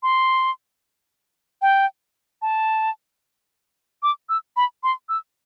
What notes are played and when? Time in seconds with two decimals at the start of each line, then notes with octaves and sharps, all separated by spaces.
0.03 C6
1.62 G5
2.42 A5
4.03 D6
4.29 E6
4.57 B5
4.83 C6
5.09 E6